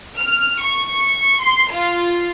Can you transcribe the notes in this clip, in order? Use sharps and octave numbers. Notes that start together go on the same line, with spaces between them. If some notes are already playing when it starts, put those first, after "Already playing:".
F6
C#6
C6
F4